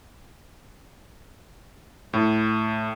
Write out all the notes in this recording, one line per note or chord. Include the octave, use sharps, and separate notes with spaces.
A2